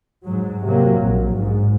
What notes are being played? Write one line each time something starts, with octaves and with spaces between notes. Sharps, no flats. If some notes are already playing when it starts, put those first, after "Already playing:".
G#2 F#3
C3 F#3 A#3
A#1
G#2